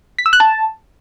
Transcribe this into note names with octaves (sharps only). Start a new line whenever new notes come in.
B6
E6
F#6
A5